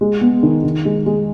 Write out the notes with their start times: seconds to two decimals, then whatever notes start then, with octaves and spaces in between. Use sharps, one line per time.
0.01 G#3
0.21 B3
0.43 D#3
0.64 D#3
0.85 G#3
1.06 G#3